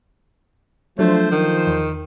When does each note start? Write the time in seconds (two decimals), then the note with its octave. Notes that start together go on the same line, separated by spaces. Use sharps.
0.99 F3 F#3 A3 D4 C5
1.32 D#3
1.67 E2